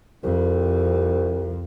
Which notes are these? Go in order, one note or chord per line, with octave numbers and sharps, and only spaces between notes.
C2 F2